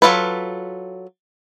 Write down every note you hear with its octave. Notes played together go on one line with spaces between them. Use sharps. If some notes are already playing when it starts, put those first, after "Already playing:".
F#3 A#3 F4 A4 B4